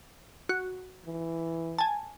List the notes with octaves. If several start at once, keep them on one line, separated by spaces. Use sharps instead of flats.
F#4
E3
G#5 A5